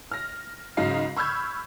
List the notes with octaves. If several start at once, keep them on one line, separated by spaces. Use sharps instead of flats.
F6 A#6
G#2 C#3 F#3 D#4 F5 C7
B5 C#6 E6 F6 G6 G#6